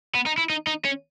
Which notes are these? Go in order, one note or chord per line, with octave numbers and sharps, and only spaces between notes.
B3
D#4
E4
D#4
D#4
C#4